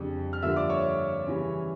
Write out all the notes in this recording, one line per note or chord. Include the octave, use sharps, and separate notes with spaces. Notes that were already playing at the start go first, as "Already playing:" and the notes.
Already playing: F2 C#3 G3 D4
F6
G2 D3 F3 A#3 E5 E6
D5 D6
C#5 C#6
C#3 E3 G3 C#4